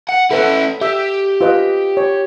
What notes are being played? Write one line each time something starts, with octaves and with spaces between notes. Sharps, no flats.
F#5
C#4 E4 A4 B4 F#5
G4 E5
F4 B4 D#5
C#5